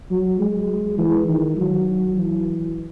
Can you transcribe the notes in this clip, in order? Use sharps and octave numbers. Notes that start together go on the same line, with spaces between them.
F#3
G#3
E3
D#3
F#3
E3